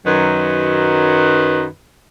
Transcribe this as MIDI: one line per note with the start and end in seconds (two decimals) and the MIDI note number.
0.07 1.67 42
0.07 1.67 51
0.07 1.67 54
0.07 1.67 71